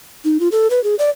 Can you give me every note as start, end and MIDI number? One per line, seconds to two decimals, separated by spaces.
0.25 0.38 63
0.40 0.49 65
0.52 0.68 69
0.70 0.83 71
0.84 0.95 68
0.99 1.10 74